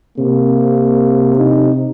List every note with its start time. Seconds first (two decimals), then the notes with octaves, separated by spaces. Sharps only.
0.18 C3 A#3
1.37 D#4